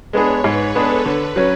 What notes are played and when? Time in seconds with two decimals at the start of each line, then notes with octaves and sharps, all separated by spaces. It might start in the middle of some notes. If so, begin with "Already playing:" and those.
0.13 G#3 B3 D4 G#4 C#5
0.44 G#2 B4
0.75 G#3 B3 D4 G#4 A4
1.05 D3 B4
1.36 F#3 C#4